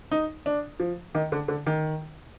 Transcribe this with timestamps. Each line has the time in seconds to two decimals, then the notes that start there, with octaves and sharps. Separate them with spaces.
0.12 D#4
0.46 D4
0.80 F3
1.15 D#3
1.32 D3
1.48 D3
1.67 D#3